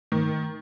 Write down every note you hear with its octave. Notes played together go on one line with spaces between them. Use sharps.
D#3